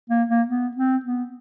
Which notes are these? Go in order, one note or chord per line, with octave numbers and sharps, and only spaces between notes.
A#3
A#3
B3
C4
B3